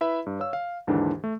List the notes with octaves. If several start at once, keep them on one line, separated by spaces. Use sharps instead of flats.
E4 B4 E5 B5
G2
C#5 F5 E6
F5
D#2 G#2 D3 E3 D4
A3